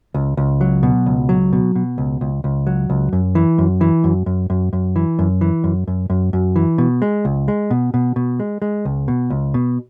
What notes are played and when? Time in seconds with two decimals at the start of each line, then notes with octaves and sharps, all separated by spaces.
0.14 C#2
0.37 C#2
0.61 F#3
0.83 B2
1.06 C#2
1.29 F#3
1.53 B2
1.76 B2
1.98 C#2
2.21 C#2
2.44 C#2
2.67 F#3
2.90 C#2
3.13 F#2
3.35 E3
3.58 F#2
3.81 E3
4.04 F#2
4.26 F#2
4.50 F#2
4.73 F#2
4.96 E3
5.19 F#2
5.41 E3
5.64 F#2
5.88 F#2
6.10 F#2
6.33 F#2
6.56 E3
6.78 B2
7.02 G#3
7.25 C#2
7.48 G#3
7.71 B2
7.94 B2
8.16 B2
8.40 G#3
8.62 G#3
8.85 C#2
9.08 B2
9.30 C#2
9.54 B2